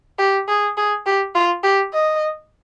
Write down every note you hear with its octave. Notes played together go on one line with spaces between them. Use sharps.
G4
G#4
G#4
G4
F4
G4
D#5